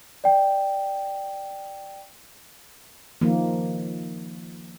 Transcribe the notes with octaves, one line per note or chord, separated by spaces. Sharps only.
D5 G5
D#3 F3 A#3